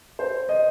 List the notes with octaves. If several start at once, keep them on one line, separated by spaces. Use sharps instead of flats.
C5
D#5